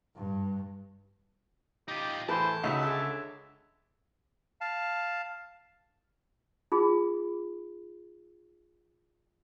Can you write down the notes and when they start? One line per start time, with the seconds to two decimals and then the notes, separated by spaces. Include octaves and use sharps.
0.16 G2
1.88 D#4 F4 G4
2.29 E2 A2 E3 C5 A5
2.64 C#2 D#4 E4 F#4 E5
2.83 D3 G#4
4.61 F5 A5
6.72 D#4 F4 G#4